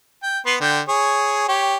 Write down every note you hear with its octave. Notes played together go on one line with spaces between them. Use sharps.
G5
B3 B4 C6
D3 G5
G#4 C#5
G4 C#5